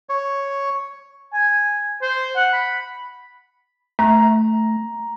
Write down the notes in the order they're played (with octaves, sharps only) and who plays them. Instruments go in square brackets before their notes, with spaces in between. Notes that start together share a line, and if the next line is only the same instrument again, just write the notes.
[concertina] C#5
[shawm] G#5
C5
F#5
B5
[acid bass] A3 [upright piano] A#5